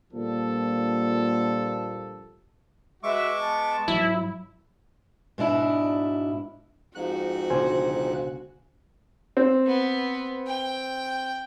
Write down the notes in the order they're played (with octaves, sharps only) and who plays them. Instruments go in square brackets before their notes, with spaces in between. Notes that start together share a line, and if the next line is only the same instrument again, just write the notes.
[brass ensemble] A#2 D3 F3 G3 A#3 A4
[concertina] G#3 C#6 D6 [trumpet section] F#4 B4 E5
[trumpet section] B3 A5
[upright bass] G#2 F#3 [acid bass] E4
[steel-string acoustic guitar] G#2 B2 D4 E4
[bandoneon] F2 G#2 F#6 [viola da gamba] F#4
[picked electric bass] C#2 B2 D3 [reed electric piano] C5 G#5
[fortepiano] C4
[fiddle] B3
G5